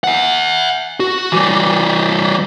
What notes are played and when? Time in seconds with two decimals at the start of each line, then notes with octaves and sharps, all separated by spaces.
0.04 E5 F#5
1.00 F#4
1.32 E3 G3